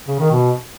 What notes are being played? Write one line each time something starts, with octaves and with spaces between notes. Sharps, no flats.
C#3
D#3
B2